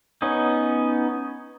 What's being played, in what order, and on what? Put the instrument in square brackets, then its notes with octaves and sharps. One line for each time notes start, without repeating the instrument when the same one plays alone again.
[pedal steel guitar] B3 C#4 D#4